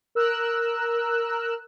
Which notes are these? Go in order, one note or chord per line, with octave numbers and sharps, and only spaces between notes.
A#4 E6 F#6